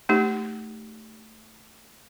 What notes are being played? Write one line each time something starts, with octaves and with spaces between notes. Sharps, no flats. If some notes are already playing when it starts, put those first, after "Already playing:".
A3 D#4 G4